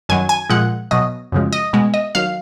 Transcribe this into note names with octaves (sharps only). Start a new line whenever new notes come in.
F#2 D#3 F#3 G#5
G#5
A#2 F3 G#3 F#5
B2 F#3 D#5
F#2 C#3 F3 G#3
D#5
B2 G#3
D#5
D#3 F#3 F5